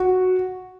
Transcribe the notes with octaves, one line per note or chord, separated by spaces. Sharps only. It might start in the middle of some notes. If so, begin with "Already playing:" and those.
Already playing: F#4